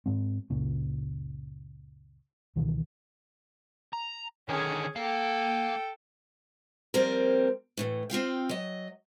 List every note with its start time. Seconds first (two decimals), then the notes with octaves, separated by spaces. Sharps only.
0.06 G#2 G#3 C4
0.50 F#1 C#2 A#2 C#3
2.56 C#2 B2 D#3 E3
3.93 A#5
4.49 D3 D#3 C#4 G#4
4.96 A#3 A4 F5 G5
6.94 F3 G3 A#3 C4 A#4
7.77 A2 C#3 E3
8.10 C4 F4 F5 G5
8.49 F#3 D#5